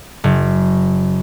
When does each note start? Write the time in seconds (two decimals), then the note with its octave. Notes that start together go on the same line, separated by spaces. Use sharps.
0.24 F#1